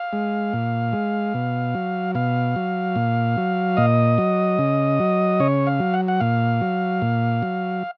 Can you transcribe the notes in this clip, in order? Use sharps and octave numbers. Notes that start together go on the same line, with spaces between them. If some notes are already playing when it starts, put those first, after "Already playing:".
Already playing: F5
G#3
A#2
G#3
B2
F#3
B2 F5
F#3
A#2
F#3
A#2 D#5
F#3
C#3
F#3
C#3 C#5
F5
F#3
F#5
F#5
A#2 F5
F#3
A#2
F#3